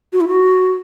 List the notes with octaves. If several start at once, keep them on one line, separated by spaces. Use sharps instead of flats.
F#4
E4
F#4